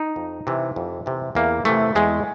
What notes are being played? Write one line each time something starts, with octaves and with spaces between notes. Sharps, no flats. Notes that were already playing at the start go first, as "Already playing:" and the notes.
Already playing: D#4
F2
C3 E3
F2
C3 E3
E2 A#3
C3 E3 A3
E2 G#3